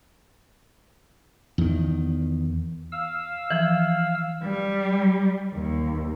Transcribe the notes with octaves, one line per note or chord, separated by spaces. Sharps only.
E2 D#3
F5 E6
E3 F3
G3
D#2